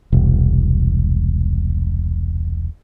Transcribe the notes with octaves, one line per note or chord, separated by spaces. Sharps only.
E1 C2